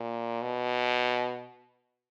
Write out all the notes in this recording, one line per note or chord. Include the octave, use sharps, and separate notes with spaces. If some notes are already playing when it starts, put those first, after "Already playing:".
Already playing: A#2
B2